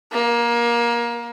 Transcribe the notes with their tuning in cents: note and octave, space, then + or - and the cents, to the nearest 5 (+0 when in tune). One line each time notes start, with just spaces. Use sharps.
A#3 +20